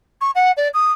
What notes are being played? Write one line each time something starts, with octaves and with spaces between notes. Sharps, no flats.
C#6
F#5
D5
D#6